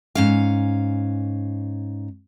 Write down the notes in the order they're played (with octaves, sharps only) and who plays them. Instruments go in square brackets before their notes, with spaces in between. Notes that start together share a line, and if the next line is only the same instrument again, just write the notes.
[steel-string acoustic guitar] G#2 C#4 F5